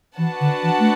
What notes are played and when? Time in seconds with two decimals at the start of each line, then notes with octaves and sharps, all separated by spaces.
0.17 E3 D4 F#4 B4 F#5 A5
0.41 D3
0.63 E3
0.79 A3